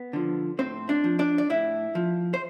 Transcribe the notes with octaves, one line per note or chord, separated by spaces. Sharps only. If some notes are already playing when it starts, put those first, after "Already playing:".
Already playing: B3
D3 F3
A2 C4 C5
D4 D5
F3
D4 D5
D5
A2 E4 E5
F3
C5